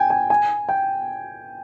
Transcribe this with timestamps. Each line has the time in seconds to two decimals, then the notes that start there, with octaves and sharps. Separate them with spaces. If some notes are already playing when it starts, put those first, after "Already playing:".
Already playing: G5 G#5
0.10 G#5
0.30 G#5
0.69 G5